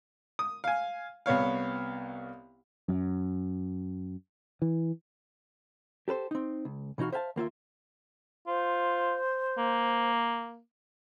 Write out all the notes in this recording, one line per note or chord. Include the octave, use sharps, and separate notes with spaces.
D#6
F5 G#5
C2 B3 C#5 F5
F#2
E3
G4 A4 B4 C5
C4 D#4
C#2
B2 E3 D#4 F#4 F5
C5 E5 F5 G#5 A5
D#2 A#3 F4 E5
F4 C5
A#3